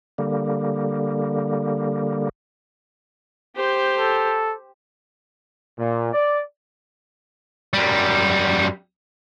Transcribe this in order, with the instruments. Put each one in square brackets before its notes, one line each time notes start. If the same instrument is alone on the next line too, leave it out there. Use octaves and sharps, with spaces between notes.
[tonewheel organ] D3 G3 A#3
[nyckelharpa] G4 C5
[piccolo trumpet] A4
[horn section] A#2
D5
[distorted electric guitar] F#2 G3